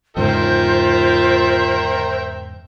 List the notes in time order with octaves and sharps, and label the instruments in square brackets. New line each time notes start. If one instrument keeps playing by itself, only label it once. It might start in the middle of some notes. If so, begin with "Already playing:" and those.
[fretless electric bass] E2 G#2 C#3 [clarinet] F4 [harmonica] A#4 E5 G5 [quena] C5